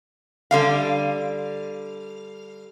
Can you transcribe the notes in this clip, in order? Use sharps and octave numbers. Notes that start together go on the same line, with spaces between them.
D3 G3 F5